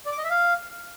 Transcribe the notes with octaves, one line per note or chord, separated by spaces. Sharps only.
D5
D6
D#5
E5
F5